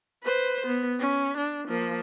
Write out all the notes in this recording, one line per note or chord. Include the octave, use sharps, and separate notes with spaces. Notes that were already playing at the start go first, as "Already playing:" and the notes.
B4 C5
B3
C#4
D4
F3 A#3